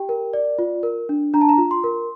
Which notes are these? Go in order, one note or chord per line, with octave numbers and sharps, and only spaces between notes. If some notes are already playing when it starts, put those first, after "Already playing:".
Already playing: G4 G5
A#4
D5
F4
A#4
D4
D4 A#5
A5
A#5
F4
C6
A#4